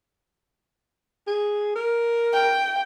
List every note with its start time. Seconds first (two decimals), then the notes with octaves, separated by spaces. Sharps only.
1.27 G#4
1.76 A#4
2.33 G5